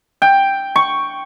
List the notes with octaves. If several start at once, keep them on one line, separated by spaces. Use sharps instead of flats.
G5
C#6